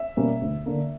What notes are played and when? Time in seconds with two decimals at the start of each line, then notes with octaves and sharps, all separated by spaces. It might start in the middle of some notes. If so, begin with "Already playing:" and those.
Already playing: E5
0.17 B2 G3 A#3 C#4
0.41 D2
0.66 D3 A#3